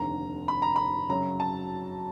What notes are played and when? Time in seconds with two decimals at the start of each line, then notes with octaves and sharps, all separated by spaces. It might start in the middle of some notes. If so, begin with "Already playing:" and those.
Already playing: F1 D#2 D3 A#5
0.48 B5
0.62 A#5
0.76 B5
1.09 F#2 C#3 F#3 A#5
1.40 A5